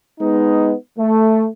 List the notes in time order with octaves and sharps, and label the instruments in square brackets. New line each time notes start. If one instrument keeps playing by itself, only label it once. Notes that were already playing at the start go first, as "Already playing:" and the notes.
[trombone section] G#3 B3 D#4
A3